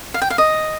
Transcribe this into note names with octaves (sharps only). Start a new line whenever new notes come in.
F5
G5
F5
D#5